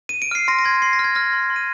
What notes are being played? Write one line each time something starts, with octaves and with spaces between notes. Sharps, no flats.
D#7
D7
F6 C7
C6 A#6
A#6
C6 G#6
C6 C7
A#6
F6
G#6
F6 A#6
C6
C6
D#7